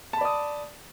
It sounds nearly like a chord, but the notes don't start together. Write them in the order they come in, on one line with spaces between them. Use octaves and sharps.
A5 B5 D5 D#6